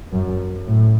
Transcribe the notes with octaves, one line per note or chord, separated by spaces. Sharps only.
F#2
A2